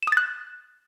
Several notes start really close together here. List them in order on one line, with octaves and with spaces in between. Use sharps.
E7 D#6 A6 F#6